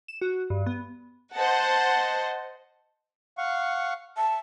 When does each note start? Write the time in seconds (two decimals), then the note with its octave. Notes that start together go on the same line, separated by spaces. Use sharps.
0.08 E7
0.21 F#4
0.50 G2
0.66 B3
1.35 C5 D#5 F#5 A5
3.38 F5 F#5 C#6
4.17 E5 A5